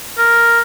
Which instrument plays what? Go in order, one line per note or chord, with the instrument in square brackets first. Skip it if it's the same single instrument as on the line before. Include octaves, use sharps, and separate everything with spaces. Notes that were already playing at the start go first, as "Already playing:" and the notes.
[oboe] A#4